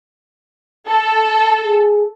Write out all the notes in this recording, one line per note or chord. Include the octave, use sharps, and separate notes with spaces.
A4
G#4